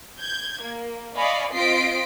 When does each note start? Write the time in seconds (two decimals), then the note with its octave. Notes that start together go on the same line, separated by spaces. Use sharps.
0.18 G6 G#6
0.63 A#3
1.16 D5 D#5 F5 G#5 B5 C#6
1.52 C4 F4 D#5 B6 C7 D7